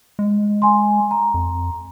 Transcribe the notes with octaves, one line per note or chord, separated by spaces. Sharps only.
G#3
G#5 C6
A#5
F2